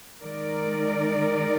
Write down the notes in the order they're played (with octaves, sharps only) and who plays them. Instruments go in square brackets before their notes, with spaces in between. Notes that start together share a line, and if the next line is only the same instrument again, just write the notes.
[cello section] D#3 G#3 D#4 A#4 D5